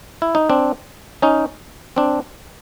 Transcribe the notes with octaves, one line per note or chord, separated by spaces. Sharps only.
E4
D#4
C4 D4
C#4 D#4
C4 D4